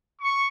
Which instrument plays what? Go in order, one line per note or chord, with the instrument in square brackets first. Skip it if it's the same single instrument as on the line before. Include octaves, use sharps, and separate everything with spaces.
[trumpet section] C#6